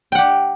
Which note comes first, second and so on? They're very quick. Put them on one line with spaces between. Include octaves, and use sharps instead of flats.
G5 F#5 G4